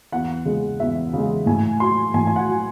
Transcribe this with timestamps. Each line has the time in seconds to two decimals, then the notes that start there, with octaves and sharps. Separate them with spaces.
0.12 E2 F#5
0.45 C#3 G#3
0.80 E2 E5
1.13 C#3 G#3
1.46 A2 G#5
1.80 F#3 C6
2.14 A2 G#5
2.27 G#5
2.36 F#5
2.48 F#3